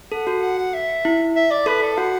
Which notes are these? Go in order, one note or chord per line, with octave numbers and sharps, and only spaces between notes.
A4 F#5
F#4
F#5
F#5
E5
E4
E5
D5
A4 B4
A4
F#4 F#5